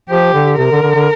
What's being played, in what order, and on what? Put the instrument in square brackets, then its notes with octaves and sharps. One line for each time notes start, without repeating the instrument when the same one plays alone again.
[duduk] F3 [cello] G4
[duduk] D3
[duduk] C3 [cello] A#4
[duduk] D3
D3
D3